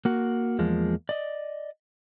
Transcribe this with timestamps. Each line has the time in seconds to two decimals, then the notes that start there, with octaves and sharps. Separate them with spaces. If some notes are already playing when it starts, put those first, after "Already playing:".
0.05 A#3 F#4
0.59 E2 F3 G#3 A#3
1.09 D5 D#5